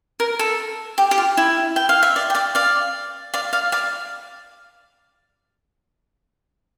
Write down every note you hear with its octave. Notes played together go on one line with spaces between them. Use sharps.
A#4
A4
G4
G4
F4
E4
G5
F5
E5
D5
G5
D5 F5
D5 F5
D5 F5
D5 F5
D5 F5